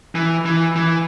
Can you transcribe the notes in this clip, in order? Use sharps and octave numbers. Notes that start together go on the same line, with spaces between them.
E3
E3
E3